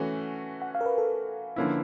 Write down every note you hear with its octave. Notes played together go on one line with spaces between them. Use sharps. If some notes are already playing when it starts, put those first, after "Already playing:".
Already playing: E3 A3 C#4 F#4
F#5
F5
A#4
B4
A4
D3 F3 A#3 C#4 E4